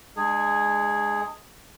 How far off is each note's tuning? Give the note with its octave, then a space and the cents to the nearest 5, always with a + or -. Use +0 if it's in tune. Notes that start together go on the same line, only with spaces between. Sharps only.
G#3 +0 D4 +40 G#4 +0